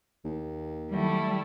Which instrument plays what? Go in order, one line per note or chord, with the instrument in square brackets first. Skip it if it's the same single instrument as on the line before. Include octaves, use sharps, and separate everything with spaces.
[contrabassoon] D#2
[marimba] D#3 F#3 [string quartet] G3 A3 E4